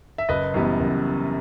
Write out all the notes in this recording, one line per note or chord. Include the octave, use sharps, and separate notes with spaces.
E5
F#1 B4 D#5
F#2 E3 G3 B3
F#1